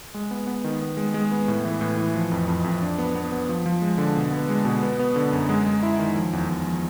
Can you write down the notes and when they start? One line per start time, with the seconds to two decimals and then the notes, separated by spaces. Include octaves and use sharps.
0.14 G#3
0.31 B3
0.47 B3
0.64 D#3
0.81 B3
0.97 G#3
1.14 G#3
1.32 B3
1.48 A2
1.65 E3
1.81 A2
1.97 E3
2.15 F3
2.31 F2
2.48 F2
2.64 F2
2.82 D4
2.98 B3
3.15 B3
3.32 B3
3.49 F3
3.66 F3
3.82 G#3
3.98 D3
4.16 B2
4.31 B3
4.49 G#3
4.65 B2
4.83 B3
4.99 B3
5.16 D3
5.32 F#2
5.49 G#3
5.66 G#3
5.83 E4
5.99 D#3
6.16 F3
6.33 E2
6.49 E2
6.66 F3